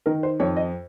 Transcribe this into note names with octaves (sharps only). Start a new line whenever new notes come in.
D#3 A#4
C5
F2 C#5
D#5